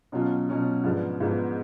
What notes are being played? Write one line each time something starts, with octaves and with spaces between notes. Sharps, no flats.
B2 F#3 C#4 F4
B2 F#3 C#4 F4
G#2 F3 B3 D4
G#2 F3 B3 D4